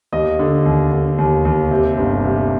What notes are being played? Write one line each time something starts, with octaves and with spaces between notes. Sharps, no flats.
D#2 D#5
D3
D#2
D3
D#2
D#2
C3
G1
C3